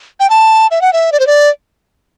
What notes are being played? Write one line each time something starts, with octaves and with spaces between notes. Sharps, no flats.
G5
A5
E5
F#5
E5
D5
C5
D5